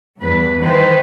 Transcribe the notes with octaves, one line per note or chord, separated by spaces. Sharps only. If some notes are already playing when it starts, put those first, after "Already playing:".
E2 G2 B4
D#3 E3 B4 C5